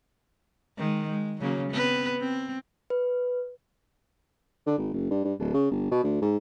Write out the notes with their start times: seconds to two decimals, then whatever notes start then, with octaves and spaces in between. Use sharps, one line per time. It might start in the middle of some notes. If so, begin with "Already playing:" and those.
0.77 D#3 G#3
1.09 G#3
1.40 C#3 F#3 A#3
1.69 B3 C4 B4
2.18 C4
2.90 B4
4.67 D3
4.78 G#1
4.94 F#1
5.11 G2
5.24 G2
5.40 D1
5.54 C#3
5.71 G1
5.91 B2
6.04 D2
6.22 G#2